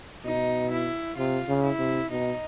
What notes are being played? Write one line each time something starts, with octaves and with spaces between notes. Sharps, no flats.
B2 D#4
E4
C3 F4
C#3
E4
C3
B2 D#4